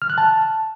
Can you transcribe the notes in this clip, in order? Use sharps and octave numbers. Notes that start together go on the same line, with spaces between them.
F6
F#6
A5